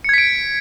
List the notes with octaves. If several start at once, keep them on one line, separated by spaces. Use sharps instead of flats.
G#6 B6 C#7 D7